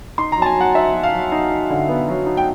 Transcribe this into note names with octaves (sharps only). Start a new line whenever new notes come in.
D#4 C6
A#5
F#3 A5
G#5
F#3 F#5
D#4 E5
F#3
F5
F#3
D#4
D#4
D3
B3
F#3
D#4
G5